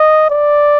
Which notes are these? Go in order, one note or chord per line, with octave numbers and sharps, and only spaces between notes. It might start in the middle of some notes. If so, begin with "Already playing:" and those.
Already playing: D#5
D5